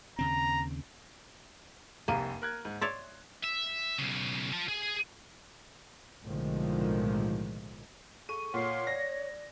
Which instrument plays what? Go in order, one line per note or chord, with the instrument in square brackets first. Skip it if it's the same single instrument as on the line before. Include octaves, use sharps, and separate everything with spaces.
[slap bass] D#2 C#3 C4 [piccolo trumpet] A#5
[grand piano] F1 C2 D#7 [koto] A#3
[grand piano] A#4 F#6 G#6
G#2
[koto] C#5 D5 E5 [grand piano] C6
[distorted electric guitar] E5
B1 C#3
F4 A5
G#4
[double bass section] B1 A2 D3 D#3 F3 G#3
[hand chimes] G#4 A4 C#6 [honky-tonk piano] D#7
[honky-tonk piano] A#2 [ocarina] C#5 [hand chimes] F#5 C7
[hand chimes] D5 [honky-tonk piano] A#6